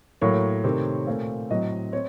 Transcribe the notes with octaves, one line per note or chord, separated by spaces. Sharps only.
A2 F#3 A#3 C#5
C3 D#3 A3 C4
A#2 A3 C4 F5
A2 F#3 A3 C4 D#5
C4 C#5